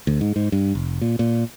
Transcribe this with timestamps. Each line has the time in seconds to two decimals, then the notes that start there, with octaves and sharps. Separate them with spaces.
0.07 D2
0.21 G#2
0.36 G#2
0.52 G2
0.75 F1
1.01 A#2
1.19 A#2